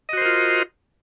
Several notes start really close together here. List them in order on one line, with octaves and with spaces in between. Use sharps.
D#5 F#4 C5 A#4 F4